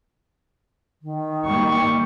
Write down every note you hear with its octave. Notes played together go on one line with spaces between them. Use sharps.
D#3
G3 A#3 C#6